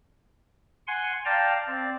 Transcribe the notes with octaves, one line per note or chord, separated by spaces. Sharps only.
F#5 G#5 C6
D5 F5 G5 A5 A#5
C4 D5